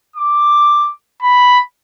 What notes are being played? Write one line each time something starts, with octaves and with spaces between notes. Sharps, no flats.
D6
B5